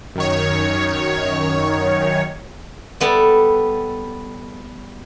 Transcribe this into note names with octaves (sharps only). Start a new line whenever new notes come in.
F#2 D#3 C#5
G3 B3 A4